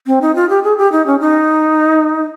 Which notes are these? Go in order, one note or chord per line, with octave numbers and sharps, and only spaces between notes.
C4
D#4
F4
G4
G#4
G4
D#4
C#4
D#4